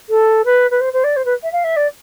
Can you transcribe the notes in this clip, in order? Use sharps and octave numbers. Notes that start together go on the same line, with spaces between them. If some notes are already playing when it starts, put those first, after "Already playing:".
A4
B4
B4
C5
C5
D5
C5
B4
E5
F5
E5
D5